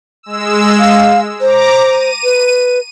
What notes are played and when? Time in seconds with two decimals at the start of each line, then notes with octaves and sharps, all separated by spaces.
0.23 G#3 E6
0.79 F5
1.41 C5 A#5 D6
1.87 D#7
2.24 B4